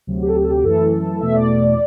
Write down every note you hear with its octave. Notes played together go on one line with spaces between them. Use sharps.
D2 C3 F#3
G4
A4
G4
A4
G4
F#2 E3 A3 A4
E2 B2 A3 E5
D5